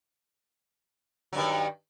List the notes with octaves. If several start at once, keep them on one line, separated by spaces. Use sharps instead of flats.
G2 D#3 F#3